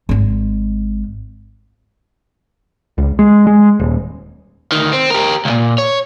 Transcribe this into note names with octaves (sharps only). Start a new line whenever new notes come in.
G#1 G#3
C#2
G#3
G#3
D#1
D2 D#3
C4
G4 A#4
C#2 A#2
C#5